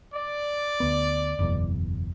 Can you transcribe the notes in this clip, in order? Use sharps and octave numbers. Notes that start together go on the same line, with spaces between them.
D5
D2 B3
F#1 E2 B2